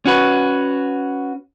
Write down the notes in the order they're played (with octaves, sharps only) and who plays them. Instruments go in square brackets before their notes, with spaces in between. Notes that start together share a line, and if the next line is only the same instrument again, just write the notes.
[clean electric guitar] C#4 F#4 B4